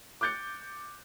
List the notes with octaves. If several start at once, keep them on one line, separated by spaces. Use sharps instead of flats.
D6 F#6 G6 A6 C#7